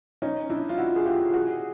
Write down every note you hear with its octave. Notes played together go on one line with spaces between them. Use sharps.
C#4 D#4
D4 E4
F4
E4 F#4
G#4
F4 G4
F#4 G#4